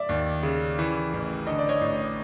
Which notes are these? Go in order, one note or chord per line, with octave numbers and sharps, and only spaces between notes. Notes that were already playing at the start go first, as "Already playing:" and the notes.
Already playing: D5 E5
D#2
C#3
E3
A1
D3 D#5
D5
C#5 D#5
A1